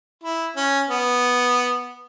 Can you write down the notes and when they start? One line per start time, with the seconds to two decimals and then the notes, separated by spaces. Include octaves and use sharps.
0.24 E4
0.56 C#4
0.90 B3